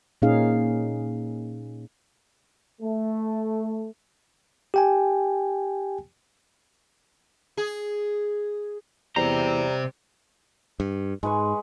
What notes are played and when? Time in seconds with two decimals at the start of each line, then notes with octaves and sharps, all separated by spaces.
0.22 A#2 A#3 C#4 D#4 G#4 F5
2.82 A3
4.74 G4 G5 G#5
7.57 G#4
9.16 E2 C3 G3 C5 A#5
10.80 G2
11.23 G#2 G#3 B4 C#6